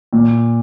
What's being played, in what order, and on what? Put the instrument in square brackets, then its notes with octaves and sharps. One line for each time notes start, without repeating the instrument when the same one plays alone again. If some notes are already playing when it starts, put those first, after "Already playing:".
[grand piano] A#2